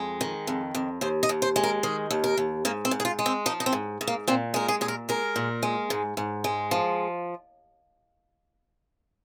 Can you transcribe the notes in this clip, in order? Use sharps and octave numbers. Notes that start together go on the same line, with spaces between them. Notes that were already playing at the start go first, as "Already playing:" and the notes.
Already playing: F2 G#3
D#3
F2
F2
D#2 C5
D#5
D#2
C5
G#3
A#4
D#3 G#4
D#2
A#4
D#2
G#2 A#3
C4
G#2
G#4
F4
G#3
C4
F3 D#4
D#4
C4
G#2
G#2
A#3
A#2 C4
G#3 A#4
G#4
A#2 G#4
A#4
G#3 A#4
A#2
G#3
G#2
G#2
G#3
F3